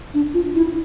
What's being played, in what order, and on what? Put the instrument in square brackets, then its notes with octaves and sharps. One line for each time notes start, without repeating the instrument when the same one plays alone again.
[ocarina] D4
F4
E4